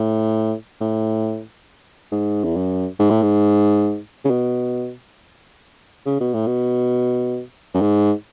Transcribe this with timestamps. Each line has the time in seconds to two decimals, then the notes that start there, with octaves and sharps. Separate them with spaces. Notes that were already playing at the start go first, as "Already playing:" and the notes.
Already playing: A2
0.81 A2
2.12 G#2
2.44 E2
2.56 F#2
2.99 G#2
3.10 A2
3.22 G#2
4.25 C#3
4.30 B2
6.06 C#3
6.21 B2
6.34 A2
6.47 B2
7.74 F#2
7.81 G#2